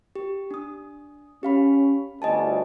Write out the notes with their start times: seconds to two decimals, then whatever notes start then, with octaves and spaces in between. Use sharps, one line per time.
0.16 G4
0.51 D4 D#6
1.43 C#4 G4 F5 B5
2.22 G1 D2 D#5 G#5 A5